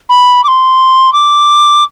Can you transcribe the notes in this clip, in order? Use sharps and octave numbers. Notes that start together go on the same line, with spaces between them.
B5
D6
C6
D6